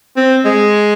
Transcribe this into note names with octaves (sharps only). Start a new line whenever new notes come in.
C4
G#3